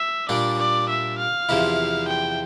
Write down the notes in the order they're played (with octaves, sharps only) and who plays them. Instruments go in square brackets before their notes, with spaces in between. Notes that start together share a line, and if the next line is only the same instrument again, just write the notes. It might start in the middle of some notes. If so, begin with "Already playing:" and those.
Already playing: [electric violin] E5
[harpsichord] A#2 G3 D4 [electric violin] D5
[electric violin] D5
E5
F5
[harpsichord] E2 C3 F3 A#3 E4
[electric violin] G5